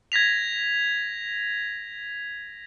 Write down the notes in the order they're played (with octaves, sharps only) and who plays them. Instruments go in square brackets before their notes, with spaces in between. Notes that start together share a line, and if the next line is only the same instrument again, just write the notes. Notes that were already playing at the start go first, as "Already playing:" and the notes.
[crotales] G#6 A#6 B6 F7